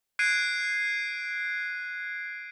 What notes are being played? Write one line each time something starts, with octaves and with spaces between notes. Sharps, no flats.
F#6 G#6 C7 D7 D#7